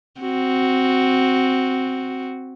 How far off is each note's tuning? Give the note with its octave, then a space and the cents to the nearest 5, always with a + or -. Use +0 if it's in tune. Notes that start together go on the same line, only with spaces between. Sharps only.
C4 +0 F#4 +0